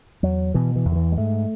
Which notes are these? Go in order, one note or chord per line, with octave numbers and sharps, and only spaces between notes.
E2 F#3
B2 E3
E3
E2
D#3
E3
G#3
G#2 A3